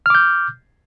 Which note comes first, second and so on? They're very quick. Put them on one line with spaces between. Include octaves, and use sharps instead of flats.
F6 D6 G6